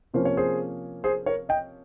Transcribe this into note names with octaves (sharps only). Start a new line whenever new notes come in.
C3 F3 A#3 C#4 C5
C#5
G#4 C5
G#4 C5
A#4 C#5
D#5 G5